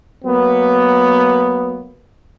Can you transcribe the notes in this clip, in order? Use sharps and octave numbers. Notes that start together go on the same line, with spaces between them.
F#3 A#3 B3